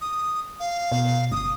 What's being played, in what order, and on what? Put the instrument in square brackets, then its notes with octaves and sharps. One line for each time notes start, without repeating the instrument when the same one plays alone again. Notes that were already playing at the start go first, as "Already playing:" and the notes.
[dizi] D#6
F5
[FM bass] B2
[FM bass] G1 [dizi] D#6